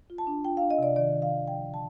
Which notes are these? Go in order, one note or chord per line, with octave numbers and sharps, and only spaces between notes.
F4
A5
D4
F4 G5
D4 F5
D#5
C3 D5
D#3 D5
D#3
F5
D#3
F3 G5
D3
A5